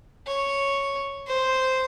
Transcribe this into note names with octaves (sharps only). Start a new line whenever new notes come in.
C#5
C5